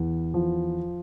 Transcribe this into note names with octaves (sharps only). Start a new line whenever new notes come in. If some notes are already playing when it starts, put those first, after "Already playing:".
Already playing: E2
F3